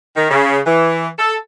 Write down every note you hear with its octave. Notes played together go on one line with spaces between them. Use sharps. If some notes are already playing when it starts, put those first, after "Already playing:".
D#3
C#3
E3
A4